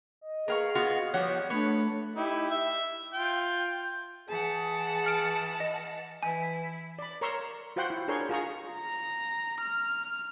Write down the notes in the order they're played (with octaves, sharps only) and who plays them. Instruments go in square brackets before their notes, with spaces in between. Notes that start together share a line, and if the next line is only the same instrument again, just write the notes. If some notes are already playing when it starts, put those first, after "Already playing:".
[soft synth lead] D#5
[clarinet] G#4 [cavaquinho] A#4 F5 C#6 [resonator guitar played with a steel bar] B4
[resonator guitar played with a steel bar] B3 F4 F#4 [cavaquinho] F5 C6
[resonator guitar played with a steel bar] F3 G3 B3 [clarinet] C#5 [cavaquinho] F#5
[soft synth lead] A3 [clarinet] D4 [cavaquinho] B4 [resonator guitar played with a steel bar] C#5
[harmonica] D#4 E4 G4
E5
F4 G5
[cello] E3 F#5 [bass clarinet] G#4 [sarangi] A5
[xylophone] F6 D7
D#5
[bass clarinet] E3 [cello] E4 [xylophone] G#5
[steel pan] D5 B5
A#4 C#5 A#5 C6 C#6 E6
F4 F#4 C5 F#5 G5 C6
E4
D4 G#4 A#4 C#5 C6
F4 G#4 A#5 C#6
[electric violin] A#5
F6